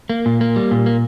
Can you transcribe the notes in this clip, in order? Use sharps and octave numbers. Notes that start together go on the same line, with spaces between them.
A#3
A#2
A#3
G3
A#2
A#3